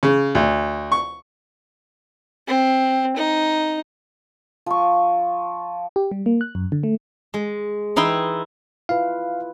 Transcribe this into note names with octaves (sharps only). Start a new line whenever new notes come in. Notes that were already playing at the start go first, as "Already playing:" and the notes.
C#3
D2
C#6
C4
D#4
F3 C#6
G4
G3
A#3
F#6
F#2
D3
A3
G#3
E3 D#4 E4 G5 C6
E4 F4 B4 F5